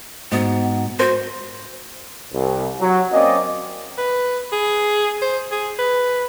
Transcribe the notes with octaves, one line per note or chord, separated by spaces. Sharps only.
G#2 B3 F#4
F#4 C5
C2
F#3
A#3 C4 C#4 D5 D#5
B4
G#4
C5
G#4
B4